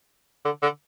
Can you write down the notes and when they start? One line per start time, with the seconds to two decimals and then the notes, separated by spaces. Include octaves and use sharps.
0.45 D3
0.62 D3